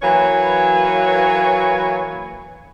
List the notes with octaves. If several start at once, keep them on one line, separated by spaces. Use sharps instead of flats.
E3 F#3 A#3 B4 C#5